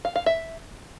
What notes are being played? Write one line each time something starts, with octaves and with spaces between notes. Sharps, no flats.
F5
F5
E5